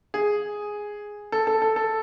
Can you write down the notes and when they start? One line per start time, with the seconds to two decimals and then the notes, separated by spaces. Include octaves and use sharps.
0.14 G#4
1.32 A4
1.47 A4
1.62 A4
1.76 A4